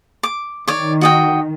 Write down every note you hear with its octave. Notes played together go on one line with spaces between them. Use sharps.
D6
D#3 C#5 D5
F#4 D#5 G5